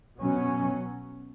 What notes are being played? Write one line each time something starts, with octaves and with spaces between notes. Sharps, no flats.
B2 F#3 C#4